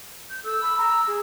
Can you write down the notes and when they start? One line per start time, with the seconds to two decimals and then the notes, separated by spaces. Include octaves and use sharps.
0.30 G6
0.44 A4 E6
0.61 B5
0.77 A#5
1.07 G#4